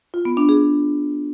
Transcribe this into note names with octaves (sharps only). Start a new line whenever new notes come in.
F4
B3
D4
G#4